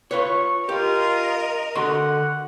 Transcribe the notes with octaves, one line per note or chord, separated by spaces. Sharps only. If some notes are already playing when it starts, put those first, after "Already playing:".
F4 B4 C#5 C#6
F4 G4 A#4 D#5
D3 F#4 F#5 C6